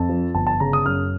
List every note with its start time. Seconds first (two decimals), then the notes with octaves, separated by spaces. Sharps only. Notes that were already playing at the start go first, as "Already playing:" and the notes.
Already playing: F2 A5
0.09 F3
0.34 G1 A5
0.47 A5
0.60 C#3 A#5
0.73 D#6
0.85 F#2 F6